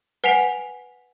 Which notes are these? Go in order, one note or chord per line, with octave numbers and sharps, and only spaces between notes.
B4 F#5 G#5 B6 F7